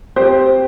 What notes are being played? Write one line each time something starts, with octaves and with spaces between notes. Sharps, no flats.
C4 G4 C5